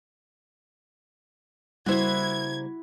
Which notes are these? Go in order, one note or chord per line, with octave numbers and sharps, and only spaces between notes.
C#3 G3 A#3 E4 F#4 C5 G#6